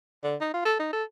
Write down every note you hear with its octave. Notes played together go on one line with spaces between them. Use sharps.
D3
D#4
F4
A4
D#4
A4